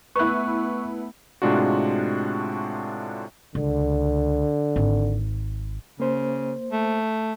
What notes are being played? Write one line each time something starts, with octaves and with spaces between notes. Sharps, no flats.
A3 B3 E4 B4 C#6 F#6
A2 C3 G#3 D4 F4 F#4
C#2 D3
G#1
C#3 A#3 C5
A3